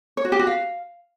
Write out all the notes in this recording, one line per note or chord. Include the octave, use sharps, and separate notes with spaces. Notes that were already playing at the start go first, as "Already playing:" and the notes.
C#5
F#4
G4
F#4
F5